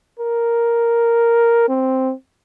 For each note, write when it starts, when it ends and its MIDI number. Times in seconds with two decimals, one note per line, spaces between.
0.19 1.66 70
1.69 2.13 60